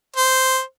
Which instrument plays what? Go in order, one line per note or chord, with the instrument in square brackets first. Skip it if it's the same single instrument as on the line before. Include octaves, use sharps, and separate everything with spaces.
[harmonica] C5